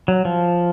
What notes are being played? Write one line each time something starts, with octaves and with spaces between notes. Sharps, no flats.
F#3
F3